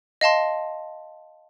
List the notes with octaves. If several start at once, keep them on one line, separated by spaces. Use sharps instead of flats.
D#5 F5 A5 C6